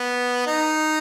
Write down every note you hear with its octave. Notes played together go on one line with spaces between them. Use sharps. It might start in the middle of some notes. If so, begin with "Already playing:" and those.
Already playing: B3
D#4